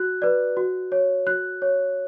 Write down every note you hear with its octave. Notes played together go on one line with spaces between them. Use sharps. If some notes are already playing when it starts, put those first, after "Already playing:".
Already playing: F#4 F#6
B4 D5
F#4
C#5
F#4 F#6
C#5